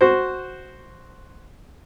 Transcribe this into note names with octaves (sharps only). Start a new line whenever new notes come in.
F#4 C5